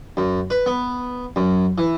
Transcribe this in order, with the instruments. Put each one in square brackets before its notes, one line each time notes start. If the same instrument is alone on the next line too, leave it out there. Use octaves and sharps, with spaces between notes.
[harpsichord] F#2
B4
B3
F#2
E3